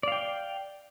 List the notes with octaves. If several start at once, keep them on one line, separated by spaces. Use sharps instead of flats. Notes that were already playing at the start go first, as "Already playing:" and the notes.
D5 F5 G5